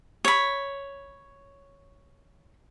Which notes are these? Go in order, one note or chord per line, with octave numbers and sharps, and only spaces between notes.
C#5 B5